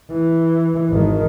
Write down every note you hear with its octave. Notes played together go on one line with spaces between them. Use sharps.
E3
G#1 D#3